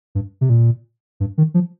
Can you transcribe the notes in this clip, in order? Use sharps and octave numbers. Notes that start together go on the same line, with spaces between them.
G2
C3
A#2
G2
D#3
F3